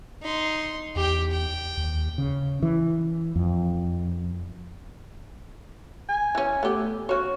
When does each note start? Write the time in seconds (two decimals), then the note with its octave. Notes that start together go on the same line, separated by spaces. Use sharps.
0.22 D#4 C6
0.96 E2 G4 G5
1.31 G5
1.77 D#2
2.18 C#3
2.63 E3
3.36 F2
6.09 G#5
6.35 E3 C#4
6.63 A3 B3 G4
7.09 C#3 F#4 C#5